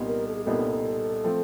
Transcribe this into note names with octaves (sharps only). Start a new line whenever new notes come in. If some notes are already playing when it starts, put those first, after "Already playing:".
Already playing: C2 A#2 G3 B3 D#4
A#4
A4
G#4
C2 A#2 G3 B3 D#4 A4
F3 A3 C4